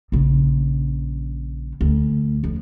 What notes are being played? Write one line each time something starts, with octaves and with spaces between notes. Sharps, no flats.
A#1 C#3
D2
F2